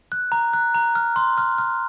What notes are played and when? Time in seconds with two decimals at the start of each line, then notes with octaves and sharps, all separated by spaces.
0.12 F#6
0.32 A#5
0.53 F#6
0.74 A#5
0.95 F6
1.16 C6
1.38 F6
1.58 F6